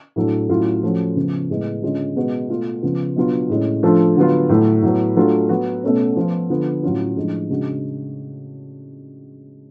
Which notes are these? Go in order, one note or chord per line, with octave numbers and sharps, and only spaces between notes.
A2 F#3 A3 D4
A2 F#3 C#4 F4
F3 A3 C#4 F#4
C#3 F3 B3
A2 G#3 B3
D3 G#3 C#4 F4
B2 G#3 B3 F#4
B2 A3 F4
C#3 F3 B3 F4
B2 F#3 B3 D4 F4
A2 G#3 C#4
F3 A3 D4 F4
D3 F#3 B3 F4
A2 F#3 A3
A2 F#3 B3
F#3 A3 D4 F4
F#3 B3 F#4
B2 A3 C#4
F3 B3 F4
D3 F3 B3 F4
A2 F#3 C#4 F4
A2 F3 G#3 D4
C#3 G#3 D4 F#4